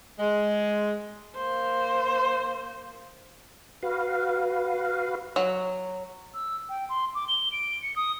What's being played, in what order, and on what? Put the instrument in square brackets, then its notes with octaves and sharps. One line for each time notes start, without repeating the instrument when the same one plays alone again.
[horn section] G#3
[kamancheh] A#3 C5
[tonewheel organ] F#4 B4 F5
[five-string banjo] F#3
[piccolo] E6
G5
C6
D6
G7
D7
C#7
D#6